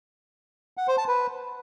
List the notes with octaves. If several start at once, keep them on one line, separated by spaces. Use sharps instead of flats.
F#5
C5
A5
B4